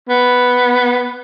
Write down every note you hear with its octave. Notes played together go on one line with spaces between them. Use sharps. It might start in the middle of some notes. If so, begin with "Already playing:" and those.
B3